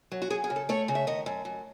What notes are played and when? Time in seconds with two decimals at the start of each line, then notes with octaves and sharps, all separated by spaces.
0.12 F#3
0.22 F#4
0.30 F#3 G#4
0.44 G#4
0.50 C#3
0.56 A4
0.69 A3 C#5
0.88 C#3
0.95 E5
1.07 D#3 D#5
1.26 F#2
1.45 F#2